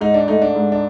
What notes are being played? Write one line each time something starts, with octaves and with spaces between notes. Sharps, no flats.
G#2 D#4
D4
A3 D#4
D4
G#2
D4